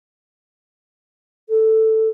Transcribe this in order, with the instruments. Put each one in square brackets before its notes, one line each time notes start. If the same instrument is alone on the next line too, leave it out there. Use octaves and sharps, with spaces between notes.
[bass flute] A4